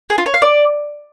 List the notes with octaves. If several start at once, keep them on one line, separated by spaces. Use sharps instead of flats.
G#4
F4
C#5
F5
D5